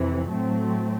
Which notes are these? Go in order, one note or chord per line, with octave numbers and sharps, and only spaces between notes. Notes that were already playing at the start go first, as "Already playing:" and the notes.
Already playing: F2 C3 E3
A2 F#3 A3 C4